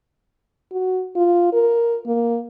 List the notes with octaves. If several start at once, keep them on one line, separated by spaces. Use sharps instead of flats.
F#4
F4
A#4
A#3